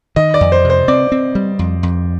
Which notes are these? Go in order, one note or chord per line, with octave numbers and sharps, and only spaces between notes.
D#3 D#5
D5
F2
C5
C3
C5
C4 D5
C4
G3
F2
F2